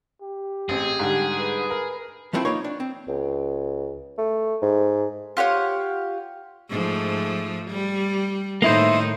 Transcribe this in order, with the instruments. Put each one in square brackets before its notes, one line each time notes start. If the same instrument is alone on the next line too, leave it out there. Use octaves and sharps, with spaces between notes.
[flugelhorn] G4
[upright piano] A1 C4 [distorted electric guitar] G#4
[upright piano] G#2 D3 G3
[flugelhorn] B4
[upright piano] A#4
[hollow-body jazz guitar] F3 G3 A3 C4 E4 F4
A#3 D#4 F4 B4 C#5
D4
C4
[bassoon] C#2
A3
G#2
[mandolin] F4 G4 C#5 F#5
[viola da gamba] G#2 F3 A3
G3
[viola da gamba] A2 D#3 D#4 [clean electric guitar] A#3 E4 C5